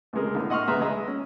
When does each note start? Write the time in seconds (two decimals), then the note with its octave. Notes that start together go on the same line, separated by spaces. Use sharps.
0.13 C#2 C3 G#3 A#4
0.35 A2 D3
0.50 D#5 F#5 C6 C#6 F6
0.68 C#2 G#4 B4 E5 A#5 C6
0.80 G#3 D#5 A#5 E6
1.08 C#4